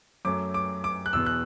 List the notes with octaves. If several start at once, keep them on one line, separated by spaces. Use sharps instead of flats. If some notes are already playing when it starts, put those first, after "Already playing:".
F#2 F#3 A3 D6
D6
D6
F#6
E2 B2 B3 E6
F#6